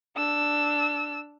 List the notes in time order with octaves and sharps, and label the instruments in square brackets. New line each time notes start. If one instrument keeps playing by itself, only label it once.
[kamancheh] D4 E6